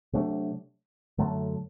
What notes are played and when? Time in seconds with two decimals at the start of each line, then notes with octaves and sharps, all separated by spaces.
0.13 C3 F#3 A3 D4
1.18 F#2 D3 F#3 A3